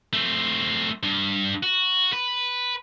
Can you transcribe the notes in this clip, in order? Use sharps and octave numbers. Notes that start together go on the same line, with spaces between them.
A3 C4
G2
F#4
B4